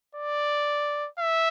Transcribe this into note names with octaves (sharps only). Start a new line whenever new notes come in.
D5
E5